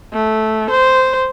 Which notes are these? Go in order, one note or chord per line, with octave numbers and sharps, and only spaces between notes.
A3
C5